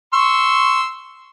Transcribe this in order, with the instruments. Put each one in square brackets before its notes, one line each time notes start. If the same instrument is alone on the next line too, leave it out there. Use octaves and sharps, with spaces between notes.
[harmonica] C6 C#6 E6